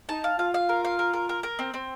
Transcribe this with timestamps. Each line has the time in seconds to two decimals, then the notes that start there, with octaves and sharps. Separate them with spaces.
0.09 D#4 A5
0.24 F5
0.39 F4 F5
0.54 F5
0.69 A#4
0.85 F5
0.99 A#4
1.13 A#4
1.29 A#4
1.43 A#4
1.59 C4
1.74 C4